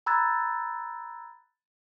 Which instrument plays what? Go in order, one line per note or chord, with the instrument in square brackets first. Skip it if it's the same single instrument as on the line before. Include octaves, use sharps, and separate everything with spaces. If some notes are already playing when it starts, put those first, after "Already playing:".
[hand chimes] A#5 B5 E6 F#6 G#6 A6